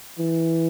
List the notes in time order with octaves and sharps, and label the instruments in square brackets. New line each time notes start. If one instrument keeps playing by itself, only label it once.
[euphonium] E3